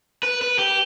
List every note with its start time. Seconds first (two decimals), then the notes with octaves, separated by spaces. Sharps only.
0.23 B4
0.42 B4
0.59 G4